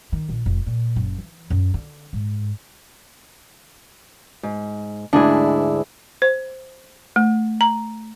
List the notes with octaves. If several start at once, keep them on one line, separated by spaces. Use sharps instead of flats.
D#3
A#1
F1
A#2
F#1
E3
F#2
D3
G#2
G#2
D2 G#2 D4 E4 G#4
C5
A3
A#5